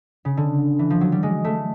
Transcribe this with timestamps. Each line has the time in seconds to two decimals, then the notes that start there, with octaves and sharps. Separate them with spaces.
0.25 C#3
0.37 D3
0.79 E3
0.90 F3
1.01 F#3
1.12 G3
1.23 G#3
1.44 A3